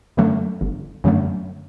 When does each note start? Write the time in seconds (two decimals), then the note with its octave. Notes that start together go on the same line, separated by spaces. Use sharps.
0.17 F#2 D3 F#3 A3
0.61 G1
1.04 F#2 D3 F#3 A3